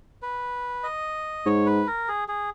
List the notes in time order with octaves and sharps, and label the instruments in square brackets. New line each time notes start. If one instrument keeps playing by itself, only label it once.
[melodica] B4
D#5
[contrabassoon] G#2 [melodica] C#5
[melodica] B4
A#4
G#4
G#4